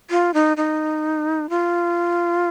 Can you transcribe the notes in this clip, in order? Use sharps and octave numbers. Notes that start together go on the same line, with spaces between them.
F4
D#4
D#4
F4